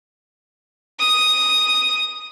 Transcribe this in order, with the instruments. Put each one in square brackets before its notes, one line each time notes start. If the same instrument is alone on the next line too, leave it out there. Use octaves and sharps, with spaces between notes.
[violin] D#6